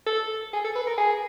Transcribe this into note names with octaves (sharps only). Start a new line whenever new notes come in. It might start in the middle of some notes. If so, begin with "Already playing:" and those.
A4
G#4
A4
B4
A#4
G#4